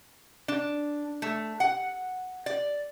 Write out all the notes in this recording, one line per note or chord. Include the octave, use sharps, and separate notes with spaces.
D4
A3
F#5
D5